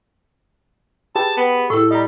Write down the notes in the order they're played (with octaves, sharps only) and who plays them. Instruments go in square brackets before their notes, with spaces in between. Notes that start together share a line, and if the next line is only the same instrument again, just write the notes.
[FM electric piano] G4 G#4 B4 [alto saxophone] A5
[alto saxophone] B3
[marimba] A2 E4 [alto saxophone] A4
[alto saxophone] G3 [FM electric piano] D#5 A#5